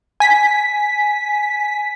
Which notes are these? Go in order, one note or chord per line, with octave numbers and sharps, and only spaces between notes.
G#5 B6